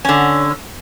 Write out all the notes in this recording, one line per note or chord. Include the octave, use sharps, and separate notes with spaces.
D3 C#4